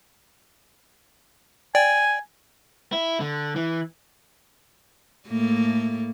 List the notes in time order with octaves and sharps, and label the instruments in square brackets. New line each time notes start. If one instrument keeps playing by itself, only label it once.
[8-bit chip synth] D5 G5 [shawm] G#5
[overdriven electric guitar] E4
D3
E3
[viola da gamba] A2 A3 A#3